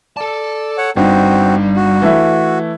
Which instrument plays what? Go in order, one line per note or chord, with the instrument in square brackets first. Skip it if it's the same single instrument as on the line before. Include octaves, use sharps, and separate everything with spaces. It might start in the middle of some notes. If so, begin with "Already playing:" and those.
[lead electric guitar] A4 A5 [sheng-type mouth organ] D5
[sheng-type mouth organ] C#5 F#5
[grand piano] G1 D#4 [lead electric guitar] G3 [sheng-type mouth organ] C4 F#4
[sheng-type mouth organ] F#4
[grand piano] E3 A3 E4